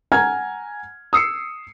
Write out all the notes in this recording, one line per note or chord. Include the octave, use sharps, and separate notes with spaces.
F#5 G#5 A#5 F6 G#6
D#6 E6 C7 C#7